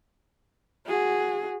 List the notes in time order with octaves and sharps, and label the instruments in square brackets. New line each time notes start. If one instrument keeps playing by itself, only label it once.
[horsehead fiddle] F#4 G#4